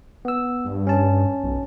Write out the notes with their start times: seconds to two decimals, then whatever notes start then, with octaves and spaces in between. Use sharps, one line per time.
0.25 B3 E6
0.65 G2
0.87 C#4 A5
1.43 B1